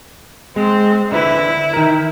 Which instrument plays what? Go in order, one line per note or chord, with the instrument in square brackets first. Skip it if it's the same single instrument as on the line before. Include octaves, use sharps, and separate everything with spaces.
[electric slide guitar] G#3 [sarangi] C4
[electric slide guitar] D3 B4 E5 [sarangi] E4
[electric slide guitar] D#3 A#4